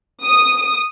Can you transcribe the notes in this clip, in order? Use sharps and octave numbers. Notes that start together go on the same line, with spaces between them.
D#6